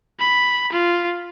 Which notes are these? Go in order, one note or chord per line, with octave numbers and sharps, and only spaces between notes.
B5
F4